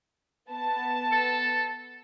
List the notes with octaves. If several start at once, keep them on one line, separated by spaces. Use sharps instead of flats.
B3 A5
A4